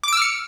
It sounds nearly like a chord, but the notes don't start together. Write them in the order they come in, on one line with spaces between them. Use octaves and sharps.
D6 D7 E6 F6 C#7